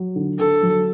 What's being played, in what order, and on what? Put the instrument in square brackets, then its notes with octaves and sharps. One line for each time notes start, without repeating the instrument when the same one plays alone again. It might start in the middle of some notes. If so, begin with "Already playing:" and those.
Already playing: [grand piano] F#3
D3
[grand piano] D3 [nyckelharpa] A4
[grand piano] F#3